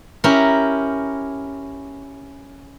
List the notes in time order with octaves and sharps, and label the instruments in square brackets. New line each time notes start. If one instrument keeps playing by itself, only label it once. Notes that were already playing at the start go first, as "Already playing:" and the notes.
[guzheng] C#4 E4 G4 A#4